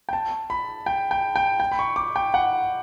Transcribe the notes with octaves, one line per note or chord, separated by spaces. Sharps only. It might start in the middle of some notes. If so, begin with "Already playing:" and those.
G5
A5
B5
G5
G5
G5
G5
B5
C#6
D6
G5
F#5